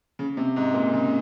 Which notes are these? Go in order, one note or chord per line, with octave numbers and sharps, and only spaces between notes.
C#3
C3
G#2
A#2
C#3